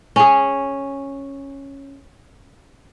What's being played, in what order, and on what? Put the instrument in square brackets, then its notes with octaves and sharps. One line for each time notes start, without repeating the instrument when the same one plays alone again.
[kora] C#4 G#4